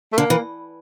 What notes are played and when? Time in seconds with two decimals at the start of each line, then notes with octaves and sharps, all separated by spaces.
0.12 A3
0.18 D3 A#3
0.30 E3